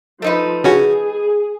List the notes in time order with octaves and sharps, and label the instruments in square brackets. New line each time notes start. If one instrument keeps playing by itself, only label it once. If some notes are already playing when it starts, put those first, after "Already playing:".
[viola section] F3 [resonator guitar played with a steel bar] A3 D#4 B4
[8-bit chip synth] C#3 C#4 F#4 [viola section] G#4